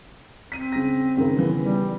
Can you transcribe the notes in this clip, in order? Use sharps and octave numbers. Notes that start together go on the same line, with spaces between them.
C4 B6 D#7
C#3 A#6
G#1 C#3 A#4
C#3 E3 B3
G3